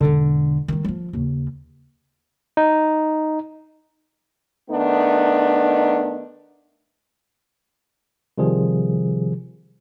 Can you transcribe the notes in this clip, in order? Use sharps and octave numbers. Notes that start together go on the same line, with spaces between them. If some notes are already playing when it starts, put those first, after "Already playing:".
E1 D3
D#3 G3
F3 F#3
D#2 C#3
D#4
D#3 A3 B3 D4 D#4
C3 D#3 F3 G3 G#4